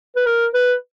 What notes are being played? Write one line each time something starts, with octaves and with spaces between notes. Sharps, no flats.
B4
A#4
B4